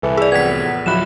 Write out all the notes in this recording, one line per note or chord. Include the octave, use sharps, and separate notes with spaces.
C2 E3 A4
G#4 D5 E6
E2 A2 F3 B3 G#6 B6
D1 B1 F3 F#3 E4 B5 F#6 E7